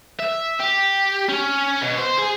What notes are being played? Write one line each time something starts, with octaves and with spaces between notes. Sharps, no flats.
E5
G4
C#4
B2
C5
G#4